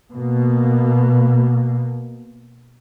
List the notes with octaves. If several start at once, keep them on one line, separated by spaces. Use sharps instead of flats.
B2 A#3